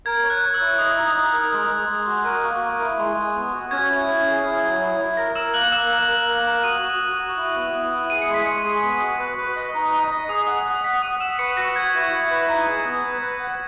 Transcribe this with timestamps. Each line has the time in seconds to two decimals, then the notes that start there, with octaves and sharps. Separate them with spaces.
0.06 A#4 G#6
0.23 C#5
0.30 F#6
0.42 C#5
0.54 E6
0.60 E4
0.78 D#5 D#6
0.97 D#4
1.15 D#4
1.33 A#4
1.51 G#3
1.69 G#3
1.88 G#3
2.06 F#4
2.24 A#4 C#6
2.43 A#3
2.61 A#4
2.80 E4
2.98 G#3
3.17 G#3
3.35 B3
3.53 F#4
3.71 C#4 G#6
3.89 E4
4.07 C#4
4.26 G#4
4.44 E4
4.63 F#3
4.81 E4
4.99 E4
5.17 A#4 A#6
5.35 A#4 E6 E7
5.54 A#3 F#6 F#7
5.72 A#3 E6 E7
5.91 A#4
6.08 A#4
6.27 A#3
6.46 A#4
6.64 F#4 D#6 D#7
6.82 F#4
7.00 F#4
7.18 F#4
7.37 E4
7.55 B3
7.73 B3
7.92 E4
8.10 G#4 D#7
8.22 C#7
8.28 G#3
8.34 B6
8.46 G#3 C#6 C#7
8.65 G#4
8.83 B3
9.01 F#4
9.19 B4
9.38 B4
9.56 D#5
9.74 D#4
9.93 D#5
10.11 D#5
10.29 G#4 D#6
10.47 F#5 D#6
10.66 F#5 D#6
10.84 F#5 B6
11.02 F#5 D#6 D#7
11.20 F#5 E6 E7
11.39 B4 C#6 C#7
11.57 F#4 A#6
11.75 F#5 G#6
11.94 E4
12.12 E4
12.31 B4
12.48 D#4
12.67 G#4
12.85 B3
13.03 B4
13.22 B4
13.40 F#5